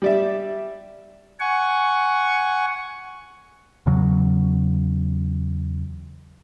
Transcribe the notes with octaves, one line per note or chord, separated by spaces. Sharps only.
G3 D5 E5
F#5 G#5 C#6
E2 C#3 F#3